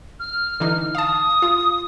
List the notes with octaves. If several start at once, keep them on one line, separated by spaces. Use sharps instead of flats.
F6
D3 E3 D#4
F5 A5 D#6
F4